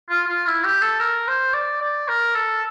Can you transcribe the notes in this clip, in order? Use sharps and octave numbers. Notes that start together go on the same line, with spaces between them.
F4
F4
E4
G4
A4
A#4
C5
D5
D5
A#4
A4